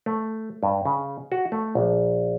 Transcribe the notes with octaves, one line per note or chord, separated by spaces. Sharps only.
A3
G2
C#3
F#4
A3
A#1